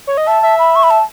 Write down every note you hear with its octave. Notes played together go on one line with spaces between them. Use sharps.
C#5
D#5
E5 A5
E5
B5
C#6
B5
A5